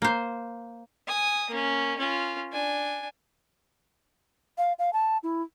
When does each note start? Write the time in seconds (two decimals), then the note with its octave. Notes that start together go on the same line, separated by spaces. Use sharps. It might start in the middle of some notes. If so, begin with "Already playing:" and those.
0.02 A#3 C5
1.08 G#5 D#6
1.50 A#3 C#4
1.98 C#4 F4
2.52 D4 G#5
4.58 F5
4.79 F5
4.93 A5
5.23 E4